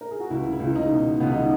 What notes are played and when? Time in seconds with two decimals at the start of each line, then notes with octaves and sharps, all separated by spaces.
0.01 A#4
0.11 G#4
0.20 F#4
0.30 C#2 E4
0.53 E4
0.60 C#2
0.75 D#4
0.91 B2
1.20 C#2 B3
1.32 D#4